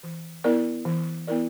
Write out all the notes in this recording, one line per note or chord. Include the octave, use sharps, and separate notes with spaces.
E3
B3 E4 A#4 D5
E3
B3 E4 A#4 D5